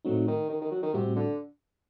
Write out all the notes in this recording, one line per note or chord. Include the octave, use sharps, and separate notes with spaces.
A2 F#3 A3 C4 D#4
D#3
D#3
D#3
F#3
D#3
A2 C3 G3 C4 F#4
D3